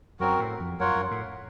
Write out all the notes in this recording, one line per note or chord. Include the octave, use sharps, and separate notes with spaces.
F#2 F#3 C4 F#4 A#4
A2
F2
F#2 F4 A#4 C#5 F#5
F#2
A2